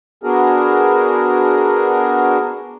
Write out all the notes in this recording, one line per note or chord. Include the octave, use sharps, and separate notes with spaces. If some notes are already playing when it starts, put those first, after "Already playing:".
B3 D4 F#4 G#4 A#4